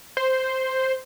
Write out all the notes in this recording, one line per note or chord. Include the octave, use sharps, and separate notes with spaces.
C5